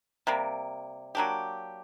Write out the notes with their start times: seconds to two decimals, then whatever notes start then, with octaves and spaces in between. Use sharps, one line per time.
0.27 C3 G3 A#3
1.15 F#3 A#3 D4 G4